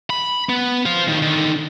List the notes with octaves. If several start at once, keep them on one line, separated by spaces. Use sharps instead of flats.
B5
B3
C5 F5
A2 D#3
D3 D#3